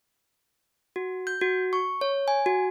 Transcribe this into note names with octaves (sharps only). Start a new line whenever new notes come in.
F#4
G6
F#4
C#6
C#5
G#5
F#4